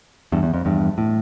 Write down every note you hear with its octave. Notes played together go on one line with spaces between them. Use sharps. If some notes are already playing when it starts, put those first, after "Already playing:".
E2 G2
E2
F2
E2 G2
A2